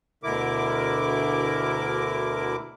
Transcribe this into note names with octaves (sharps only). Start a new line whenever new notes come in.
D2 B2 D3 E4 A#4 D6